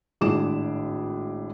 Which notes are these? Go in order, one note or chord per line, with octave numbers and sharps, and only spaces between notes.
G#1 A2 D4 G#4 D6 E7